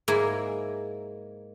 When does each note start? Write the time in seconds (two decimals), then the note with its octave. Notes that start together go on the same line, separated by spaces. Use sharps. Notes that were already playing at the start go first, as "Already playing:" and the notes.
0.08 G#2 A#3 E4 G#5